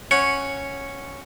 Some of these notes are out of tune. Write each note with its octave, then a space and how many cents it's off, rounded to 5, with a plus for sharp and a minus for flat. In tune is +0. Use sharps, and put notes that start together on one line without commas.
C#4 -5 F#5 +0